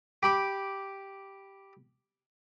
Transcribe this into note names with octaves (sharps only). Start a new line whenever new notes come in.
G4 B5 D6